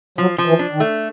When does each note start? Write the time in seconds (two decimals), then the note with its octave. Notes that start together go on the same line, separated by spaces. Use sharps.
0.18 F3 F#3
0.38 F3
0.46 E3
0.59 D4
0.73 D#3
0.80 A3